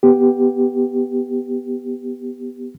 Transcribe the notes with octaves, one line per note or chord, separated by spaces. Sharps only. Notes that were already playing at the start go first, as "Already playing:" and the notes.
B3 G4